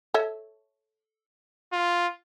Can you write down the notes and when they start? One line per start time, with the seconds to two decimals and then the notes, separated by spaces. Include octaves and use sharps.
0.14 A4 C#5 E5
1.73 F4